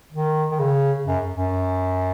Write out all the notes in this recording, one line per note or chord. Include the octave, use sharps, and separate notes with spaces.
D#3
D#3
C#3
F#2
F#2